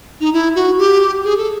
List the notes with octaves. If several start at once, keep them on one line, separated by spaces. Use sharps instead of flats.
D#4
E4
F#4
G4
G#4
A4